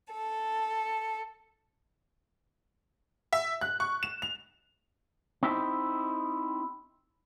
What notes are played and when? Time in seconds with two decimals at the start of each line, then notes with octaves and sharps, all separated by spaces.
0.13 A4
3.33 E5
3.61 F#6
3.80 C#6
4.03 E7
4.22 F7
5.43 C4 D#4 E4 G4